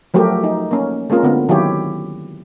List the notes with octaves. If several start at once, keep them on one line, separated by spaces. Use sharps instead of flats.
F3 F#3 A3 F#4 G4 A#4
D#4
A#3 C#4
G#3 A#3 C4 C#4 F4 A#4
D3 B3 C4
D#3 F#3 E4 G4 C#5